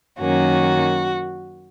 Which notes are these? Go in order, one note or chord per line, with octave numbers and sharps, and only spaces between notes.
F#2 D#3 A#3 C#4 F#4